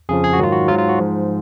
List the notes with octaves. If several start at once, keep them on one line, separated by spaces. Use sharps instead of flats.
F2 C#3 F3 G#4
G#4
F#4
G#2 D#3 F#3 F4
F#4
G#2 F#3 F4
F4
F#4
G#2 F3